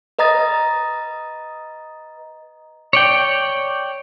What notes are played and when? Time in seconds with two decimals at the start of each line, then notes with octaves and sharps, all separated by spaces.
0.19 B4 D#5 A#5 D#6 A6
2.93 C#5 D5 G5